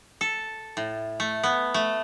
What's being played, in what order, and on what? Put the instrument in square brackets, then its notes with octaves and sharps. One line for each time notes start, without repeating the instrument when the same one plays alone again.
[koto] A4
A2
A3
B3
A3